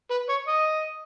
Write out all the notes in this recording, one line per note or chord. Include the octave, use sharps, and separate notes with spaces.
B4
C#5
D#5